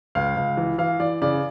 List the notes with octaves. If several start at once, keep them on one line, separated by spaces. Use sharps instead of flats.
C#2 F5
C#2
E3
E3 F5
E3 D5
C#3 D5